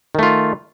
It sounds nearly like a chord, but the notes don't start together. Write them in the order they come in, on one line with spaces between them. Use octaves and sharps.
D#3 A3 F4